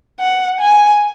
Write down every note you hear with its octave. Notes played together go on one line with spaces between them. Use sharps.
F#5
G#5